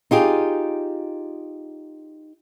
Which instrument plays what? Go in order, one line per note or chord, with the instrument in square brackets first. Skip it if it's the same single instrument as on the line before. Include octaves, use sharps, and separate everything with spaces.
[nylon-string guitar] D#4 F4 G4 G#4